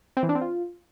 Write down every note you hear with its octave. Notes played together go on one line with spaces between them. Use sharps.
C4
E3
D4
C4
F4